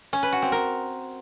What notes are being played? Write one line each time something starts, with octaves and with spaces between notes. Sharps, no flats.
C#4
B4
F#4
C4
A#4